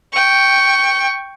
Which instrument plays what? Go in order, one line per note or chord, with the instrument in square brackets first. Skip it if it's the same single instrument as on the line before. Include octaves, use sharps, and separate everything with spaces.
[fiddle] G5 C#6